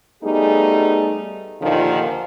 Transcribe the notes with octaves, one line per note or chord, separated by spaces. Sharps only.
G3 A3 B3 D#4 G#4
D#2 A#2 D3 D#3 F3 F4